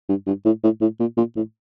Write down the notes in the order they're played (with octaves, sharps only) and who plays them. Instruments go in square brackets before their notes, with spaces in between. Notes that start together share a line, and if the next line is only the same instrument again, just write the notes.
[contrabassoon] G2
G2
A2
A2
A2
A#2
A#2
A2